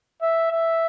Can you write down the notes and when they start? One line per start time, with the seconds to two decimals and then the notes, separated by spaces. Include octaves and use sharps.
0.21 E5
0.51 E5